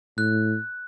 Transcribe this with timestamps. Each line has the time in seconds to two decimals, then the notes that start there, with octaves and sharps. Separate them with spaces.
0.17 A2 F#6